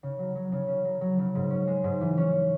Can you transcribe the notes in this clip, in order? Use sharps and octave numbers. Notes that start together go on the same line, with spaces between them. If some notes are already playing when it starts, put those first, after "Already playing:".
C#3
F#3
F#3
C#3
C#4
F#3
F#3
C#3
G#2
C#4
G#3
G#2
E3
C#4